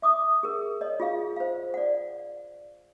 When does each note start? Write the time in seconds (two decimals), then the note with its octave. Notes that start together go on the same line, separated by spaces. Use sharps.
0.02 E5 D6 D#6
0.43 G#4 A#4
0.81 C#5 D#5
1.00 F4 G#4 F5
1.36 C5 F5
1.74 D5 F#5